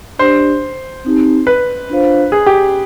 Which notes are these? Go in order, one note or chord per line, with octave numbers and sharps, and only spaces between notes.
D4 G4 C5 D5
C4 D#4 G4
B4
D4 F4 C5 F5
G#4
G4